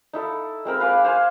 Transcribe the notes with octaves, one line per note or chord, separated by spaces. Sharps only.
D#4 E4 A4
G#3 C4 A#4 B5
B4 F5 G#5 D6
C5 F5 G#5